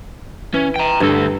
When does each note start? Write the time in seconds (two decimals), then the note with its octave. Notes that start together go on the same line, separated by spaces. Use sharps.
0.54 E3 C#4
0.76 G5 A#5
1.00 D2 G2 A4